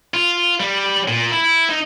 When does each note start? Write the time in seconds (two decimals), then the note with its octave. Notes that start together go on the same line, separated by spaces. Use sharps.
0.14 F4
0.60 G3
1.08 A#2
1.31 E4
1.69 D#4